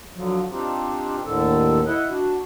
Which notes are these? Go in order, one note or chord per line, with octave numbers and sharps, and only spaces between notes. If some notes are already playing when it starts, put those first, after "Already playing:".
D3 F3 F#3
C4 D4 D#4 F4 G4
D#2 A2 D3 D#3 A4
E4 D#5 F#5
D4 F#4